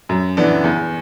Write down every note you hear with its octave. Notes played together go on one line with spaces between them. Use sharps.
F#2
E3 B3 D4
E2